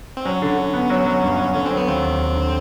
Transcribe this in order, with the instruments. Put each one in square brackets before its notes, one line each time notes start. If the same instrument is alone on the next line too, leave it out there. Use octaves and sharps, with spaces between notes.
[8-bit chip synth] C4
[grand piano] F#3 [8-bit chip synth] C#4
[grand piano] D3
D3
B3
F#3
F#3
G2
F#3
[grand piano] D3 [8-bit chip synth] C#4
[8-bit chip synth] C4
[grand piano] F#3
[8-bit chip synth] B3
[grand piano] D#2 [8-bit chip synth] C4
[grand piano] D#2
D#2
D3